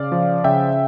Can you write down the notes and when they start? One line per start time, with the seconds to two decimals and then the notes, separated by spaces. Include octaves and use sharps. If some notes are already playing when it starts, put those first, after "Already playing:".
Already playing: C#3 D5 F5
0.12 F3
0.44 C#3 E5 G5